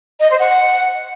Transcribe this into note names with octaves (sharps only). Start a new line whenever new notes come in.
D#5
C5
F#5